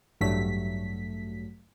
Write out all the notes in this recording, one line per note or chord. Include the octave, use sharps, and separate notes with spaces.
A1 G2 F#3 A3 B6